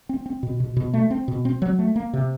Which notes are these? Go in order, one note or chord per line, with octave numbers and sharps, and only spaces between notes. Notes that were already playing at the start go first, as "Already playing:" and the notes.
C4
C4
B2
B2
B2
A3
C4
B2
C4
F#3
A3
A#3
C3